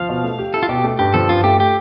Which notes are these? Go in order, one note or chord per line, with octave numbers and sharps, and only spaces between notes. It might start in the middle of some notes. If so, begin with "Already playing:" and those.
Already playing: F3 F5
B2
A3
G4
E4 A4
F4
B2 G4
A3
G2 G4
F3 A4
G2 F4
A3 G4
G4